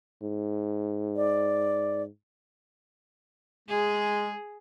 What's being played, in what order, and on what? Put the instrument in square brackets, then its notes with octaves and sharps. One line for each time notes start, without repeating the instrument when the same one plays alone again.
[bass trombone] G#2
[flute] D5
[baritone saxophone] G#3 [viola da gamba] G#4